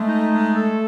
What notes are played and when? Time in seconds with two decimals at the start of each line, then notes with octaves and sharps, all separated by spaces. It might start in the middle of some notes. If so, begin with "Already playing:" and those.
Already playing: G#3 A3
0.08 D#4
0.31 G#3
0.54 A4